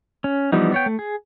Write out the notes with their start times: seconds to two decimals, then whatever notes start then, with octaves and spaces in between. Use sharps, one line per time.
0.24 C#4
0.52 E3 F3 G3 B3 D#4
0.72 B3 C#5 G5
0.86 A3
0.99 G#4